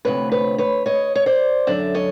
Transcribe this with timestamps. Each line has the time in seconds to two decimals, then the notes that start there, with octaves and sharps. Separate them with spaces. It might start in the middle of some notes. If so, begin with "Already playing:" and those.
0.05 D2 C3 F3 B4 C#5
0.32 B4 C#5
0.58 B4 C#5
0.86 C#5 D#5
1.15 C#5
1.26 C5 D5
1.67 F#2 D3 F#3 D5 E5
1.95 C#5 D#5